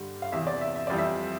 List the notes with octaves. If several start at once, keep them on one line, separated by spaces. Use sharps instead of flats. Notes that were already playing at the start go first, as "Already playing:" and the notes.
Already playing: G2 D3 G3
F5
E2 C3 E3 E5
D5
E5
E5
F2 E3 G3 D5
E5